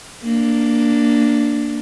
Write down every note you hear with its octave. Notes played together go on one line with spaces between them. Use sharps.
A#3 D4